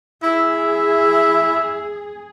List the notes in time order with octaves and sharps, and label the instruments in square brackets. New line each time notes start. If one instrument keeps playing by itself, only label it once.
[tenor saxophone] E4 [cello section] G#4 [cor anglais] E5